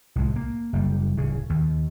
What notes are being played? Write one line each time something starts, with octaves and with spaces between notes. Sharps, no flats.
C2 A2 G#3
A#3
F#1 G3
D1 C#3
D#2